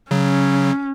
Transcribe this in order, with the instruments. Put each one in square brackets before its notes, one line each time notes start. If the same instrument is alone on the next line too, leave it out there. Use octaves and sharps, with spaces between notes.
[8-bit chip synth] C#3 F#3 [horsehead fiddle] C#4